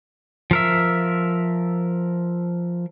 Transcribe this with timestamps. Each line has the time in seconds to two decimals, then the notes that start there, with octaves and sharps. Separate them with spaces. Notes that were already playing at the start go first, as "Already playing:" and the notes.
0.51 F3 A#4 E5